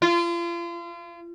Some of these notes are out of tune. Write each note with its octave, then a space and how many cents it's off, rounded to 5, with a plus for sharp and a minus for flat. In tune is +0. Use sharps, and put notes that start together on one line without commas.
F4 -35